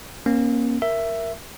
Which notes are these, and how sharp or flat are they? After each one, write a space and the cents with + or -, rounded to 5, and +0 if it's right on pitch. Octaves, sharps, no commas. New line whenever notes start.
A#3 +20 C#4 -30
A#4 +0 E5 +10